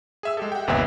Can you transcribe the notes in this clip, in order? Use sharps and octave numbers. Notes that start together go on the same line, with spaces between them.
G#4 E5 E6
G#3 G4 A4
F#5 G5
G1 D#2 C3 B4 E5